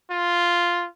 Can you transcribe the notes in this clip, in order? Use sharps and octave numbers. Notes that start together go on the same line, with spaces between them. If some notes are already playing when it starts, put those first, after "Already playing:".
F4